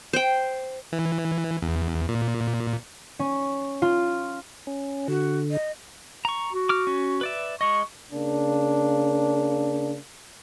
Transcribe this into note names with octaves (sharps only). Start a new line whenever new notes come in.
C5 G5
E3
E2
A#2
C#4
F4
C#4
D3 F#4
D#5
A#5 C#6
F#4
D6 F6
C#4
B4 D5 E5
G#3 D#5 C#6
C#3 A#3 D4